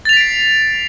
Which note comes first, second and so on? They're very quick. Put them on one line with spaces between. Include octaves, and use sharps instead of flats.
A6 F7 B6 D7 C7